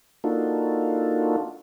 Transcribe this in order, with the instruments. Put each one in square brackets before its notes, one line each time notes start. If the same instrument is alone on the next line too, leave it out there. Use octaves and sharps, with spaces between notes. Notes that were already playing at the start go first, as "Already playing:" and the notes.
[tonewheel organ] A#3 D4 D#4 F4 F#4 A4